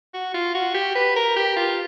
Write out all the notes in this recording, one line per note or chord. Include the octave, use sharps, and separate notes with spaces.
F#4
F4
F#4
G4
B4
A#4
G4
F4